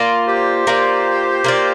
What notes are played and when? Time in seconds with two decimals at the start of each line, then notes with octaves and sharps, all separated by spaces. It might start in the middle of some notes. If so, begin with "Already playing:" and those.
Already playing: A#3 F4 D5
0.28 G4 C5
0.67 A#3 F4 D5
1.44 A#3 F4 D5